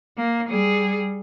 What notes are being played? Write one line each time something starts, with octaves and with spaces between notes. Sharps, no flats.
A#3
G3 G#4